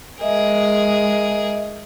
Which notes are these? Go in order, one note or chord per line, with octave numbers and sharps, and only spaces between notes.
G#3 G#4 A#4 D#5 E5